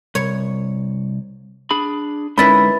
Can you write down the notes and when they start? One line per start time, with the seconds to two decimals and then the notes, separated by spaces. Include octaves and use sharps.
0.15 C2 C#5
1.71 D4 G#4 B5
2.38 D3 G#3 C#4 D#4 E4 B4 B5 A6